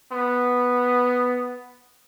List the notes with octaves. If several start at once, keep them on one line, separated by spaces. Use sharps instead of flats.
B3